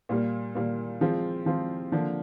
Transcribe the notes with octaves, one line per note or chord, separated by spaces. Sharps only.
A#2 G3 A#3
A#2 G3 A#3
F3 G#3 C4 F4
F3 G#3 C4 F4
D3 F3 A#3 D4